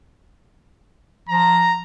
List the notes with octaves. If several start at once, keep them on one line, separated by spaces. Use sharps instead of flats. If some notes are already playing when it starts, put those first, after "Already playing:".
F3 A#5